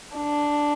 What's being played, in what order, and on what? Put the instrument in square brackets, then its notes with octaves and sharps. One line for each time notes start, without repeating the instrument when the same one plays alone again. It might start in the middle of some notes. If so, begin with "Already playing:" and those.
[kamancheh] D4